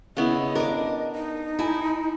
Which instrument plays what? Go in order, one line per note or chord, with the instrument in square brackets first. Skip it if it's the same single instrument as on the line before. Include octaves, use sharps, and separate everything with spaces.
[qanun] C#3 B3 E4 [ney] D#5
[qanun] D4 D6 [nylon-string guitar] A#4
[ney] D#4
[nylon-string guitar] E4 G#5 A5